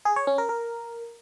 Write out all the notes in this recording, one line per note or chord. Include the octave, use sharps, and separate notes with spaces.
G#4
C#5
C#4
A#4
A#4